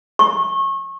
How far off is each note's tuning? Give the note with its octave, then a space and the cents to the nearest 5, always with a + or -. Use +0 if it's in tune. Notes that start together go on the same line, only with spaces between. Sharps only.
C#6 -30